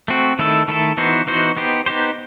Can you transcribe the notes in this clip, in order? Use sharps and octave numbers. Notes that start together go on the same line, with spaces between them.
A3 C4 F#4
D#3 A3 E4 A4
D#3 A3 E4 A4
E3 B3 D#4 F#4 C5
E3 B3 D#4 F#4 C5
B3 D#4 G4 C5
B3 D#4 G4 C5